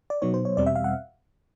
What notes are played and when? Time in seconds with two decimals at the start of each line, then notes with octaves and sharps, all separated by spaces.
0.10 D5
0.22 B2 F#3 B3 D#4 C#5
0.34 C5
0.45 C#5
0.57 E2 B2 G3 C4 D5
0.66 E5
0.75 F5
0.84 F#5